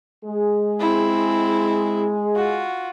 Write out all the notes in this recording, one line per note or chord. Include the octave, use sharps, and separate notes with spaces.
G#3 G#4
C4 E4
F4 F#4